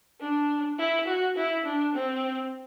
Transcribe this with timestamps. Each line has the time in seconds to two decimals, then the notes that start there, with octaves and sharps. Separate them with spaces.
0.20 D4
0.79 E4
1.07 F#4
1.36 E4
1.66 D4
1.95 C4